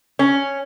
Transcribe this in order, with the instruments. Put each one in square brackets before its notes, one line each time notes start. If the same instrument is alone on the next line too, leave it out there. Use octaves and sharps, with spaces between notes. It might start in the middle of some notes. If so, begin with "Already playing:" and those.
[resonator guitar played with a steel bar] C#4